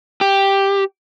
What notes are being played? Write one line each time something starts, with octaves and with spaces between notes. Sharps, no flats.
G4